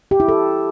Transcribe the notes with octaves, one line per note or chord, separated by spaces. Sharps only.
G4
E4
A4